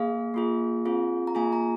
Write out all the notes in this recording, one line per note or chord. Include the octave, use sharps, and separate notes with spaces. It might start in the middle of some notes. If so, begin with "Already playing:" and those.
Already playing: A#3 G#4 F5
A#3 F4 G#4
C4 F4 G#4
A#5
A#3 F4 G#4 G#5
A#5